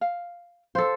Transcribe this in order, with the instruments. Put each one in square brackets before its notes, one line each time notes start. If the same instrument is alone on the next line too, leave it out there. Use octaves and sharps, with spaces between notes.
[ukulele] F5
[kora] A4 C5 [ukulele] F5